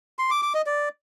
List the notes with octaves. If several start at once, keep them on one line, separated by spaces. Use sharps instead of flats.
C6
D6
D6
D#5
D5